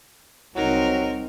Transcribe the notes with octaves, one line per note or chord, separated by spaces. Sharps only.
C2 F#3 C4 D#4 A#4